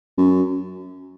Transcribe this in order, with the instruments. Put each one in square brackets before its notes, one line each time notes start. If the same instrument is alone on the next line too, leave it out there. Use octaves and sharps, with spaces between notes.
[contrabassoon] F#2